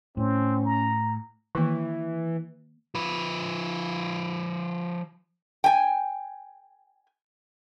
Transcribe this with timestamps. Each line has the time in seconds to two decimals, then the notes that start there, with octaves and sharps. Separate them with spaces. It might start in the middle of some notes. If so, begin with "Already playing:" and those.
0.17 A2 C4 C#4
0.65 A#5
1.55 D#3 E3 A#3
2.95 F3 B4
5.64 G5 G#5